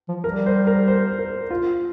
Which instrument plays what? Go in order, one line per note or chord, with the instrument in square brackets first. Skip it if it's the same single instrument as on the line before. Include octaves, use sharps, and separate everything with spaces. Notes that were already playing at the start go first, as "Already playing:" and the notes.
[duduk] F3
[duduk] G3 [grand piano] A#4
[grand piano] C5
A#4
C5
A#4
F4